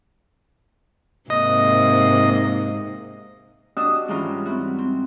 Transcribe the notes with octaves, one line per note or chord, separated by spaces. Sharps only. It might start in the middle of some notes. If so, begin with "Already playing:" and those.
G#2 C3 A#3 D#5
D4 F#4 G4 D#5 D#6 E6
G#2 E3 G3 C#4 F4 A#5
C4 E4 F#4
C4